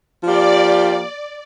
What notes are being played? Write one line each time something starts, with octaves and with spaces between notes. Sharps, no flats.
F3 A#3 G4 D5